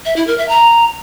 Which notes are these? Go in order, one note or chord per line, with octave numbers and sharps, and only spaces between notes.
E5
E4
A#4
E5
A#5